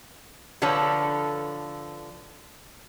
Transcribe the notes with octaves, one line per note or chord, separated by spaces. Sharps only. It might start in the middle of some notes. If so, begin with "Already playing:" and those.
D3 F3 A4 B4 C#5